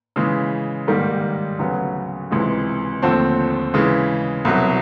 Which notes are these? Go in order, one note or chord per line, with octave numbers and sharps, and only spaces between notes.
C#3 E3 G#3
G#2 D#3 G3 A#3
D2 C#3 F#3 B3
C#2 C3 E3 G#3
D#2 D3 F3 A3 C4
C#3 E3 G#3
C2 B2 F#3